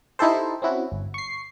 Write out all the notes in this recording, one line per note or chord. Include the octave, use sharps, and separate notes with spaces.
D#4 E4 G4 A4 C5
C4 C#4 E4 F#4
G1
C#6 C7